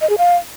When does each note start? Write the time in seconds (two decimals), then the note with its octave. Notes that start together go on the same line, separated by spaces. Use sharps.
0.01 D#5
0.10 G#4
0.18 F5